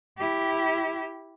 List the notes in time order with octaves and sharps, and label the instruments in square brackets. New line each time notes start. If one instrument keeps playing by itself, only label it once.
[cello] E4 G4